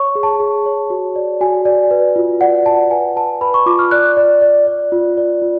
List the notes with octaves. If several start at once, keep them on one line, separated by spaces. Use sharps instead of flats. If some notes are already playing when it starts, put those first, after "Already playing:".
Already playing: C#5 C#6
G#4
A5
G#4
C#5
F#4
D5
F#4 G#5
D5
B4
F4
D5 F#5
D5 A5
B4 G#5
B4 A5
B4 B5
C#6
F4 D6
F6
D5 F#6
D5
D5
D5
F4
D5
F4